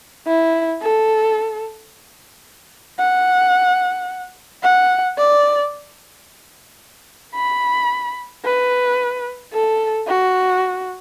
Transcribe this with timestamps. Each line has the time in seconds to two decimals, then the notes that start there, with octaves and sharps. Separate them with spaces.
0.27 E4
0.82 A4
2.99 F#5
4.63 F#5
5.18 D5
7.35 B5
8.44 B4
9.53 A4
10.08 F#4